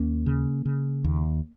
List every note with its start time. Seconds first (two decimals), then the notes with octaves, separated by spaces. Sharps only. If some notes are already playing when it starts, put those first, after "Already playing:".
Already playing: D#2 A#3 C#4
0.26 C#3
0.65 C#3
1.04 D#2